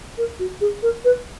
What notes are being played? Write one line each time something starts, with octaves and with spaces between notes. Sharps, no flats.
A#4
F#4
G#4
A#4
B4